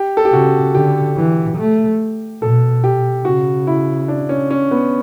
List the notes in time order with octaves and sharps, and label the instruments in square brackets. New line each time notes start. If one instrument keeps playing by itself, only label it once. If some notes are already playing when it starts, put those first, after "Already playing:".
Already playing: [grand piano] G4
A4
G4
[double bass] C#3 [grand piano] F#4
[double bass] D3 [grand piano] G4
[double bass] E3
A3
[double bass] B2 [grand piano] A4
[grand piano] G4
[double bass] C#3 [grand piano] F#4
[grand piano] E4
D4
C#4
C#4
B3